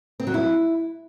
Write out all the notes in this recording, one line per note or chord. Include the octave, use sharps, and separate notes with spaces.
C4
F#3
E4